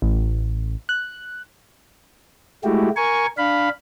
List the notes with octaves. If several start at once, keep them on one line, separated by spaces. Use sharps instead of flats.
A1
F#6
G#3 A3 E4 F#4 G4
A#4 G#5 C#6
D4 F5 B5